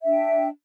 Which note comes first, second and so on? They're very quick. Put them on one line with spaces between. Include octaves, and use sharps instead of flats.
E5 D4 G5